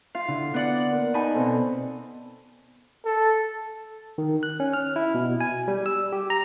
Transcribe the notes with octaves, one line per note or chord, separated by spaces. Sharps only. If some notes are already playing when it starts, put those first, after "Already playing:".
F4 F5
D3 E4
B3 D5 F#5
A#3
D#4 G#5 A5 B5
B2 C4 A4
A4
D#3
F#6
C#4
F6
E4
B2
G#5
G3
E6
G4
A#5